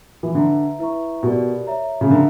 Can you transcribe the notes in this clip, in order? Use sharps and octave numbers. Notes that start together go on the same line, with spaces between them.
E3
D3 B4 E5 A#5
E4 B4 E5 A#5 C#6
B2 G4 A#4 D5
C#5 E5 A#5
C#3
D3 A#4 E5 A#5